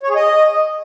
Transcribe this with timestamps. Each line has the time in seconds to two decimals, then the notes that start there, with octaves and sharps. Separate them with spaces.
0.03 C#5
0.09 G#4
0.16 D#5